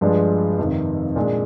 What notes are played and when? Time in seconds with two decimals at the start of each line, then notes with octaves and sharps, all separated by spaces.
0.01 G2 F3 G#3 D4
0.58 F2 C3 D#3
1.16 A#2 G#3 D4